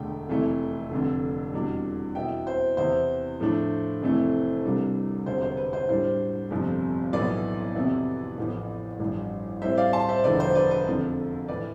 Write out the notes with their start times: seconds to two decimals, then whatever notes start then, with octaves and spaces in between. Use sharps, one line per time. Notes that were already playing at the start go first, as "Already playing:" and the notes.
Already playing: E1 D2 D3 A3 G5
0.29 F1 F2 E3 A3 E4
0.91 F1 F2 D3
1.53 E2 B2 G3 D4
2.15 E2 B2 B3 E4 E5 G5
2.47 C5
2.77 E2 C3 E3 B3 E4 C5
3.40 A2 F3 A3 D4
4.01 F1 F2 E3 A3
4.64 C2 C3 G3 D4
5.26 E1 D2 C3 C5
5.42 C5
5.57 B4
5.73 C5
5.89 A2 G3 D4 C5
6.51 G1 F2 C3 F3
7.13 B1 A2 E3 B3 B4 D5
7.75 F2 C3 E3 B3 E4
8.38 A1 A2 F3 B3
9.00 A1 G2 F3
9.62 A2 G3 C4 C5 E5
9.77 D5 F5
9.93 A5 C6
10.08 C5 E5
10.24 E1 D2 D3 F3 B4 D5
10.40 C5
10.55 B4 D5
10.71 B4
10.86 F2 D3 F3
11.48 A2 E3 B4 D5